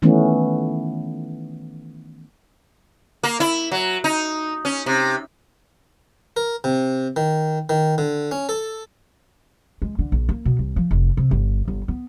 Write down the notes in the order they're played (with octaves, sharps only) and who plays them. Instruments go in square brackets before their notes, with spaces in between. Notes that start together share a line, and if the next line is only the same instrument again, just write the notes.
[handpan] D#3 E3 A3 B3 C#4
[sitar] A#3
E4
F#3
D#4
C#4
C3
[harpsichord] A#4
C3
D#3
D#3
D3
C#4
A4
[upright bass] G#3
D3
A#1
A#3
B2
C2
F3
F1
C3
G1
G1
B3